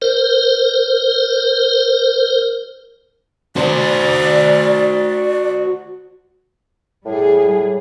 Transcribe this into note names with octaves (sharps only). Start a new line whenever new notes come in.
A#4 C5
F#4 C5 D5
A2 G3 G#4